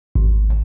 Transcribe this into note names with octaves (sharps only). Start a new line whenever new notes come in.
G#1